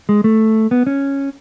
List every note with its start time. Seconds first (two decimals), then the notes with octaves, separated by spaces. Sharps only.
0.09 G#3
0.24 A3
0.71 B3
0.87 C#4